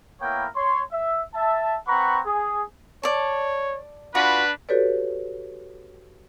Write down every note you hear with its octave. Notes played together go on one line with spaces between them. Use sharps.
A#3 B3 E4 A#4 C#5 G5
C#5 C6
E5
E5 A5
C4 B4 F#5 A#5 B5 C#6
G#4
C#5 D5 A5
D4 F4 F#4 B4
F#4 G4 A4 B4 C#5 D5